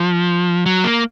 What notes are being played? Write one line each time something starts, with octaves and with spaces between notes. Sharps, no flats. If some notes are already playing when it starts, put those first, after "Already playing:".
Already playing: F3
F#3
A#3